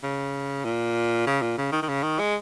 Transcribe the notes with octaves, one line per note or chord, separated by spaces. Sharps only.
C#3
A#2
C#3
A#2
C#3
D#3
D#3
C#3
D#3
G#3